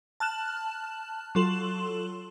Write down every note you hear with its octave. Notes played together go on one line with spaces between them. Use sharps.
A5 F6 F#6 E7 F#7
F#3 F4 A4 C6 E7 F#7